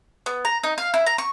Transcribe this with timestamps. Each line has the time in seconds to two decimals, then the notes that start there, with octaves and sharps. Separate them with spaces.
0.26 B3
0.45 A#5
0.64 D#4
0.78 F5
0.94 E4
1.06 A#5
1.18 C#6